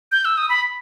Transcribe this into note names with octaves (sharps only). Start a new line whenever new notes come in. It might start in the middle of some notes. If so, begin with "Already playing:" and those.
G6
E6
D#6
B5